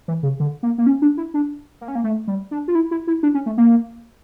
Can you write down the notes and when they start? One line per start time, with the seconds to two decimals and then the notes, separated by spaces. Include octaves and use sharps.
0.08 E3
0.23 C#3
0.40 D3
0.63 A#3
0.78 A#3
0.86 C#4
1.02 D4
1.17 E4
1.34 D4
1.81 A#3
1.88 C#4
1.95 A#3
2.04 A3
2.27 G3
2.51 D4
2.68 F4
2.75 E4
2.91 E4
3.07 E4
3.23 D4
3.34 C#4
3.46 A3
3.58 A#3